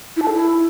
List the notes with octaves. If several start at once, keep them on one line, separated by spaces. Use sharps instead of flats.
E4
A5
A4
E4